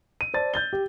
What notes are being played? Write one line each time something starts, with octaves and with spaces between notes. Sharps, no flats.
D#7
C5 D5 A5 A6
G6 A6 G7
G4